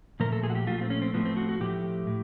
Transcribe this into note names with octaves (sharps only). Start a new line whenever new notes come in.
A#2 F3 A3 A#4
A4
G#4
F#4
G4
A#2 F3 A3 F4
C4
C#4
C4
A2 F3 A3 B3
C4
F#4
F#4
A2 F3 A3 G4
A2